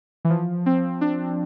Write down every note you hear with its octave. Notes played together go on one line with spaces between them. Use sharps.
E3
F3
C4
D4